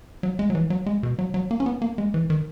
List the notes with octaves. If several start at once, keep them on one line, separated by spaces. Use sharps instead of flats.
F#3
G#3
F#3
E3
F#3
G#3
B2
F#3
F#3
A#3
C#4
B3
A#3
G#3
E3
D#3